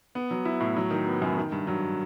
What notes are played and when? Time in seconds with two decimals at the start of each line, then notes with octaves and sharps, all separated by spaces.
0.15 B3
0.31 F#3
0.45 E4
0.60 A2
0.77 F#3
0.91 D#3
1.07 B3
1.22 F#2
1.37 D#3
1.52 G2
1.67 F#3